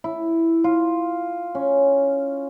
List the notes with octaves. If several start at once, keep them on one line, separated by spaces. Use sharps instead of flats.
E4
F4
C#4